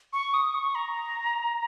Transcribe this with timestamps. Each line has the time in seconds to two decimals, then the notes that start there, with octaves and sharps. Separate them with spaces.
0.13 C#6
0.34 D#6
0.55 C#6
0.75 A#5